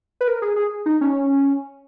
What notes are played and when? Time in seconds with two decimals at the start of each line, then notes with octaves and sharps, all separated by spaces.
0.21 B4
0.28 A#4
0.42 G#4
0.56 G#4
0.86 D#4
1.01 C#4